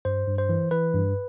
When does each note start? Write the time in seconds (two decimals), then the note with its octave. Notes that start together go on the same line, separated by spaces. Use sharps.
0.05 G2 C5
0.27 G2
0.38 C5
0.49 E3
0.71 E3 B4
0.94 G2